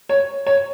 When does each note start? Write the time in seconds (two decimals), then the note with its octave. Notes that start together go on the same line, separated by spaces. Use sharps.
0.09 C#5
0.46 C#5